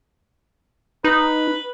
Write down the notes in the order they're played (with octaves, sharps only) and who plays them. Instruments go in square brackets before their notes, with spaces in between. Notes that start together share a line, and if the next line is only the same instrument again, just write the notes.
[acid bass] D#4 [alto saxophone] B4